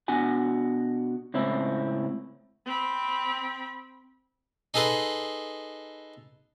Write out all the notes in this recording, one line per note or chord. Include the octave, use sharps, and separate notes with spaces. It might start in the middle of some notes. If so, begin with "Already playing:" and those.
B2 D4 F#4 G#5
C#2 A2 C4 C#4 E4
C4 B5
D#4 G#4 A4 B4 C6